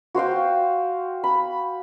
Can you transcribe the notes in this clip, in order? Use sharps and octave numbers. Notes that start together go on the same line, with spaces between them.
F#4 C5 F5 G5
B5